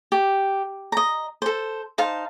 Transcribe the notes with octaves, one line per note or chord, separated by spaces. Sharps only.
G4
D#5 A#5
A4 C5
D#4 C5 F5 A5